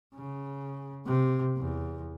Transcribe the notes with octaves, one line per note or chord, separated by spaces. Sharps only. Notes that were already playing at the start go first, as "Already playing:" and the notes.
C#3
C3
E2